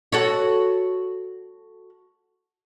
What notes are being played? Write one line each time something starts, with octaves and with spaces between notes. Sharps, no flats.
F#4 A4 C#5